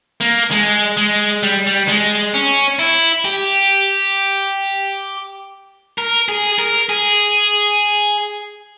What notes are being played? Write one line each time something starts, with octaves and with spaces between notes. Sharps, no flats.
A#3
G#3
G#3
G3
G3
G#3
C#4
E4
G4
A#4
G#4
A#4
G#4